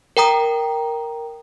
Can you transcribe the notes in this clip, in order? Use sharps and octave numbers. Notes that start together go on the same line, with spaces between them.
A#4 G5 A#5 D#6